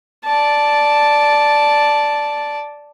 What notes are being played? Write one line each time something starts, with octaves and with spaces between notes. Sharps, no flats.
D5 A5